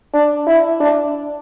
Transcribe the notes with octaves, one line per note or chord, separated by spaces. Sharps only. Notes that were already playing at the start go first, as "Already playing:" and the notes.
D4
E4
D4